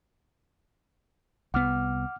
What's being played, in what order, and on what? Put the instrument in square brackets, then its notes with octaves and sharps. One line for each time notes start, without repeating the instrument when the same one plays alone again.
[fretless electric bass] C2 B3 [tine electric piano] F#5 D6 F6